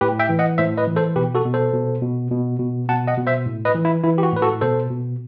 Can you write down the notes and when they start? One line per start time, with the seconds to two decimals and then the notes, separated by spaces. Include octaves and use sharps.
0.01 A2 G4 B4
0.19 E5 G5
0.29 E3
0.39 D#5 F#5
0.58 A2 C5 E5
0.77 B4 D#5
0.87 E3
0.96 A4 C5
1.16 B2 G4 B4
1.35 F#4 A4
1.45 B2
1.54 A4 C5
1.73 B2
2.02 B2
2.31 B2
2.59 B2
2.89 B2 F#5 A5
3.07 D#5 F#5
3.17 B2
3.27 C5 E5
3.46 A2
3.65 B4 D#5
3.75 E3
3.85 E4
4.04 E3 E4
4.18 G4
4.23 F#4
4.32 A2 B4
4.42 F#4 A4
4.61 B2 A4 C5
4.90 B2